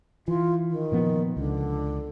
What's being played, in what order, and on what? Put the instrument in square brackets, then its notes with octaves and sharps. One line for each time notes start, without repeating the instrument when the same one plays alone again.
[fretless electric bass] E3 [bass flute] F4
[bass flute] D#3
[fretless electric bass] A#2 F3 B3
[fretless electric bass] C#2 [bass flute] D3